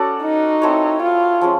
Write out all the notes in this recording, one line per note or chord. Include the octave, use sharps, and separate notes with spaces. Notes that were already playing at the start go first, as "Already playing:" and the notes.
Already playing: C#4 F#4 A4 D5
D#4
C4 E4 A4 C#5
F4
F3 G#3 C#4